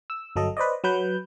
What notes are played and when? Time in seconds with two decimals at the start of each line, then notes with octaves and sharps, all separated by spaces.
0.10 E6
0.36 G1 F#3 A4 D#5
0.57 B4 C5 D5 D#5
0.84 F#3 B4 G6